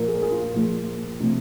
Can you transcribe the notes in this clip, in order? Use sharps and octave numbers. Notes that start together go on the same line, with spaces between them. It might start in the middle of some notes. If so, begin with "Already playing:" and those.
Already playing: A#2 F3 A#4
G#4
A#4
G#4
F4
A#2 F3
C3 F3